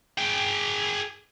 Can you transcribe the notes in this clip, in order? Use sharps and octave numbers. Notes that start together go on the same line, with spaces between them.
G#4 G5